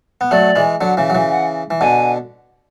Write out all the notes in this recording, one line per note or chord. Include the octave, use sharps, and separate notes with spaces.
B3
F#3 A3 D5
E3 G#3
D3 F#3
C#3 E3
F#3
C#3 E3
F#5
E3
B2 D3 G#5